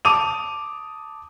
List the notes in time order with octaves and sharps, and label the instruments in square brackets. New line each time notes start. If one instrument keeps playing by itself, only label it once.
[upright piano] A5 D6 D#6 D#7 F7